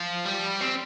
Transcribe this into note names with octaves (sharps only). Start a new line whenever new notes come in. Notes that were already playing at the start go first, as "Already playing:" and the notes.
Already playing: F3
G3
C4